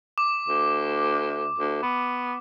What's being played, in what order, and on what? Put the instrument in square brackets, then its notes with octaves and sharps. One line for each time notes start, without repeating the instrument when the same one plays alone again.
[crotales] D6
[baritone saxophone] D2
D2
B3